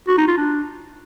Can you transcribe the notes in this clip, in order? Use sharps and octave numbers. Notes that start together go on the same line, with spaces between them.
F#4
D#4
F4
D4